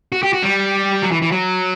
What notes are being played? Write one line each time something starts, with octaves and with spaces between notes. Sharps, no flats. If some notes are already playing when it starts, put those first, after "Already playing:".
F#4
G4
F#4
G3
F#3
E3
E3
F#3